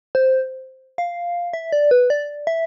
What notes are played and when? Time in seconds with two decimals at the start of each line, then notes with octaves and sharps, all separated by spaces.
0.15 C5
0.98 F5
1.53 E5
1.72 D5
1.91 B4
2.10 D5
2.47 E5